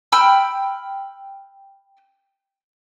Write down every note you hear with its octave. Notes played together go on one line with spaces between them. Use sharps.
G5 B5 E6 F6